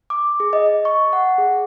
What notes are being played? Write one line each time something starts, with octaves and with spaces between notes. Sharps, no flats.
D6
G#4
D#5
D#5
C#6
F#5
G#4